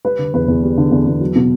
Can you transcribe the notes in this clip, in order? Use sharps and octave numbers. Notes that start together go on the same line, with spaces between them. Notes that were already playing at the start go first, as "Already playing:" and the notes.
G3 B4
D3
E2 B4
E2
G3
D3
E2
E2
F#3
B2